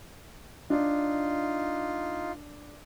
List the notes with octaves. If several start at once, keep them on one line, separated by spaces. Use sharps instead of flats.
D4 D#4 F4